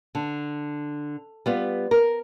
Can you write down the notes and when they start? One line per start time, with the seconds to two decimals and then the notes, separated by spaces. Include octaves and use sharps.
0.15 D3
1.46 G3 B3 F4
1.91 A#4